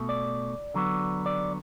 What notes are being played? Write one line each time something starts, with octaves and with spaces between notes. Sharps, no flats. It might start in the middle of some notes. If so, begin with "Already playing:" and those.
Already playing: B2 A3
D5
D3 F#3 B3
D5